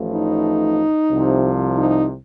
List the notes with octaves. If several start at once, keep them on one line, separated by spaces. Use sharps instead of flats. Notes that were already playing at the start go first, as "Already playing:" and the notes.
Already playing: A1 A2 F3
D#4
C2 C3 F3
D#4